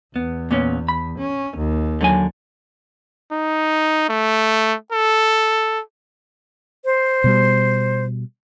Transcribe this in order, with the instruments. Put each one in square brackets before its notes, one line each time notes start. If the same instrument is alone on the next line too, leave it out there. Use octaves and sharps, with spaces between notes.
[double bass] E2 [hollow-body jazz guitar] B3
[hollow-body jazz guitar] A#2 B3 C#4
B5
[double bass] C#4
D#2
[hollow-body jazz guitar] D3 F#3 G#5
[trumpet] D#4
A3
A4
[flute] C5
[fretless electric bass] B2 G3